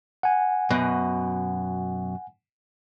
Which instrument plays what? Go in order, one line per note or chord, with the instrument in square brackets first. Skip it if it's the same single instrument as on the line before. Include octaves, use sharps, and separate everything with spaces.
[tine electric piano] F#5 G#5
[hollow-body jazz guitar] F#2 B2